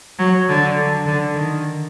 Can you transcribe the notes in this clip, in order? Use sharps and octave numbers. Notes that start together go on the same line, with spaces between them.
F#3
D3
D3
D#3